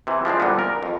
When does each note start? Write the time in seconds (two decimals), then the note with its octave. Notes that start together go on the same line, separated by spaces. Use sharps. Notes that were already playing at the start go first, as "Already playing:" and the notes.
0.07 C3 E3
0.25 F3 G#3 C4 D4
0.40 C2 A#2 D3 G3 B3
0.59 A#4
0.83 F2